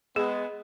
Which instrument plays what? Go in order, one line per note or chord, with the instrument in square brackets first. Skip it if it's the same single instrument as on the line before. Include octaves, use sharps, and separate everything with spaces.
[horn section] G#3 B3 [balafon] G#4